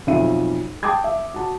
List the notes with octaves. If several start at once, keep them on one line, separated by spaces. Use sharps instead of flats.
B1 F2 F4 E5 D#7
G5 A5 D6 D#6 G#6
E5
F#4 A5